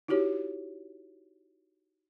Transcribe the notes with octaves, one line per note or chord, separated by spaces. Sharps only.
D#4 E4 F#4 G4 C#5